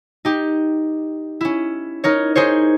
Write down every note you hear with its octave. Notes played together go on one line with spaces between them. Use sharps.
D#4 G4
C#4 E4
D#4 A#4 C#5
D#4 G#4 C5 C#5